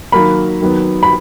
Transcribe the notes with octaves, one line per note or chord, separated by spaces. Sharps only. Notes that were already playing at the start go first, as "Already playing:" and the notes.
D#3 F#3 A#3 B5
D#3 F#3 B3
B5